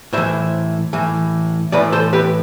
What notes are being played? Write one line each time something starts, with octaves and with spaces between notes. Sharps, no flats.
A2 E3 C5 E5
A2 E3
A2 E3 B4 D5
A4 C5
G4 B4